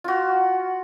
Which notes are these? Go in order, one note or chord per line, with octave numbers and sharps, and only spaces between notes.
F4 F#4